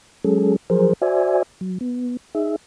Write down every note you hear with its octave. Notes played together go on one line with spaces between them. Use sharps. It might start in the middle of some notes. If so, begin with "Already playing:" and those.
F#3 G#3 C#4 G#4 A4
F3 F#3 G#4 A#4 C5
F#4 C5 D5 E5 G#5
F#3
B3
D#4 G#4 E5